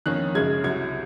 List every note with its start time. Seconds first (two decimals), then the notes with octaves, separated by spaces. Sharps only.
0.06 F2 D#3 A#3 C#4 F#6
0.35 F#2 C#3 G#3 G#6
0.64 C2 C3 F#3 G#6